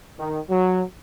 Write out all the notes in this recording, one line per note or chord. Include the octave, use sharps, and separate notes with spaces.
D#3
F#3